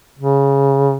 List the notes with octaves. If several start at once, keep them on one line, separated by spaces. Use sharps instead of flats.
C#3